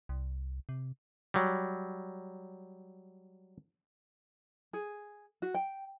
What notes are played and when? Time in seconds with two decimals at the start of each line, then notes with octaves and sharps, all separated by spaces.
0.09 C2
0.69 C3
1.34 F#3 G3
4.73 G#4
5.42 F#4
5.55 G5